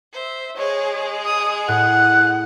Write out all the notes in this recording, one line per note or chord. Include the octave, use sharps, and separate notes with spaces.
C5 E5
G#3 G#4 C#5
D#6
A2 F#5 F#6